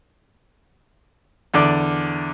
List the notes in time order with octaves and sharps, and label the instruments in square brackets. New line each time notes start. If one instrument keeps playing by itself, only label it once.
[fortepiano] E2 D3 D5